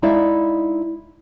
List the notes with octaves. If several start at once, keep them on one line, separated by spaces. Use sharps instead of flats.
G#3 D#4 E4 D5 E5 F5